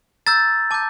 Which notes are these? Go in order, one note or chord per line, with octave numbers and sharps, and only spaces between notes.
A#5 E6 G6 A6
A5 D6 G6